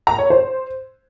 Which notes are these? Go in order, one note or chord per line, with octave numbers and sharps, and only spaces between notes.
A#5
C#5
C5